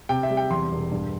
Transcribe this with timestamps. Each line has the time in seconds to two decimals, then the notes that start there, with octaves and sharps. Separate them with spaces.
0.09 C3 G5
0.23 E5
0.30 G3
0.37 G5
0.51 E2 C6
0.72 E1
0.92 G2